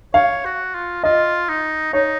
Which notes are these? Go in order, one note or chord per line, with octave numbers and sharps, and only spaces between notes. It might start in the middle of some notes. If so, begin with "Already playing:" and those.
C#5 F5
F#4
F4
F4 D#5
D#4
D#4 C#5